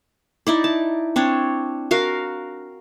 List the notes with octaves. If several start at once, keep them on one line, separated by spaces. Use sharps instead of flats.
D#4 E4 D5
A5
C4 D4 C#5
F#4 A#4 F5